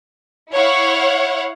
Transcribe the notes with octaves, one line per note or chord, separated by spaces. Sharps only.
E4 C#5 F5 F#5